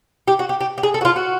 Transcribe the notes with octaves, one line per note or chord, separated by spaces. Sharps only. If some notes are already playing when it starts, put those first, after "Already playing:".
G4
F#4
G4
G4
G4
G#4
A4
F#4
F4
F#4